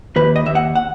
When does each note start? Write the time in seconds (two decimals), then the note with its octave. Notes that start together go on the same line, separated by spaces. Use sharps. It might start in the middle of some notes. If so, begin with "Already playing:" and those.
0.16 D#2 B4
0.36 D#5
0.46 D#2 E5
0.55 F#5
0.75 F#5